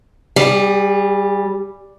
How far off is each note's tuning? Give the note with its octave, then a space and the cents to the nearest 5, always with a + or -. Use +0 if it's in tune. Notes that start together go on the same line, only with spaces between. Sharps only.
G3 +0 G#4 -35